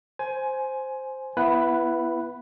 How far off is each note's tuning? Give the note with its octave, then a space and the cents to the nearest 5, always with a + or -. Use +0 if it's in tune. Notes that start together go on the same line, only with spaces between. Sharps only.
C5 +0 G#5 +15
B3 +0 E4 +25 B4 +0